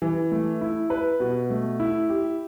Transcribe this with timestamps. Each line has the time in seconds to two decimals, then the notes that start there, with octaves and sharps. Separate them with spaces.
0.02 E3
0.32 A3
0.61 E4
0.90 B4
1.20 B2
1.50 A3
1.80 E4
2.09 G4